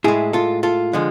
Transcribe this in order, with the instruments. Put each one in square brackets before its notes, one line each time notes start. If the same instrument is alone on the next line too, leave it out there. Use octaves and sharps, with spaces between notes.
[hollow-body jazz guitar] A2 G#3 E4 G#4
F4 A4
F4 A4
D3 F3 G#3